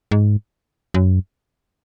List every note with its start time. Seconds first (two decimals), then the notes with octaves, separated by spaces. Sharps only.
0.11 G#2
0.94 F#2